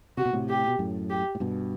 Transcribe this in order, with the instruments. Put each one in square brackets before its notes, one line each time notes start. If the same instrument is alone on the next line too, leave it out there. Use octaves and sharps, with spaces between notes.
[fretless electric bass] C3 [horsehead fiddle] F#4
[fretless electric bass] B2
A2 C3
[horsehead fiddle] G4
[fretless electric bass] B2
F#2 A2
[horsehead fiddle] G4
[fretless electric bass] A2
G2 B2